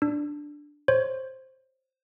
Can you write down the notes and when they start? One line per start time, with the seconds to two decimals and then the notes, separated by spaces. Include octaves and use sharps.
0.02 D4
0.88 C5 C#5